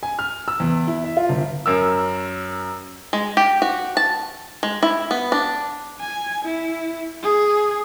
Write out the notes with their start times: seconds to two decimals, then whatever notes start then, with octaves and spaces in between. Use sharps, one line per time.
0.03 G#5
0.19 F6
0.48 E6
0.60 E2
0.87 E4
1.04 E5
1.17 F4
1.29 G1
1.66 F#2 A#4 E6
3.13 G#3
3.37 G4
3.62 F#4
3.97 A5
4.63 G#3
4.83 E4
5.11 B3
5.32 D4
6.01 G#5
6.45 E4
7.23 G#4